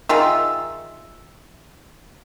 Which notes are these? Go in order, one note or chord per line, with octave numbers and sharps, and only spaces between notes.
D#3 F4 G#4 E5